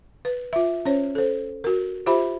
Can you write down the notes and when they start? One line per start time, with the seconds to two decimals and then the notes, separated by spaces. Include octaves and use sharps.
0.25 B4
0.53 F4 E5
0.85 C#4 C5 C#5
1.15 A4 C5
1.64 F#4 A#4
2.06 F4 G4 C5 E5 B5